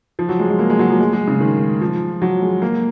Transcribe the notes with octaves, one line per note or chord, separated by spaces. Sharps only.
F3
F#3
G#3
G#3
A#3
G#3
F#3
F3
G#3
G#3
C#3
D#3
F3
F#3
G#3
A#3